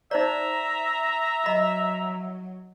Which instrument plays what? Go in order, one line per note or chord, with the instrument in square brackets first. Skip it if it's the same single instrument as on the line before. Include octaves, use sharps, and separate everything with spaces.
[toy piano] D#4 C5 D5 [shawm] E5 [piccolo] A#5
[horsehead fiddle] F#3 [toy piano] D#5 B5